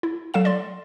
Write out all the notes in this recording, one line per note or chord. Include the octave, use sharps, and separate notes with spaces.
E4
F#3 A4 F5 E7
D5 C6